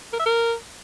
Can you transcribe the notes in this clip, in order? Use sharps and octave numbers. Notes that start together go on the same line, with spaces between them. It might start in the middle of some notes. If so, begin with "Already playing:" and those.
A#4
E5
A#4